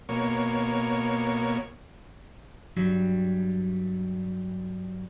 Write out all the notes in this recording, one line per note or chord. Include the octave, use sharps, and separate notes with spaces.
B2 A#3 C#5
G2 F#3 G3